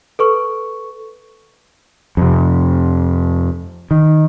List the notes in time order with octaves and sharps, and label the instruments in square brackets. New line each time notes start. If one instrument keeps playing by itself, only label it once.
[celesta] A4 B4 C#6
[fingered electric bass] F2 C3
D#3